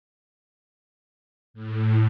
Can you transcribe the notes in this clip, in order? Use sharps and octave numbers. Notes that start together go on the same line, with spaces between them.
A2